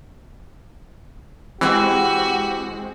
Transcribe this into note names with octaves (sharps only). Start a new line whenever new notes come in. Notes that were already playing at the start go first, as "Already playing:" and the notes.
E3 G#3 C4 F#4 G4